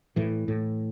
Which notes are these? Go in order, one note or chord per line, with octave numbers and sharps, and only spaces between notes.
A2 E3
A2